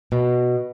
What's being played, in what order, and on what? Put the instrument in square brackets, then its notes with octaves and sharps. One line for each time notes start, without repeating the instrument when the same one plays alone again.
[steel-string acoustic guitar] B2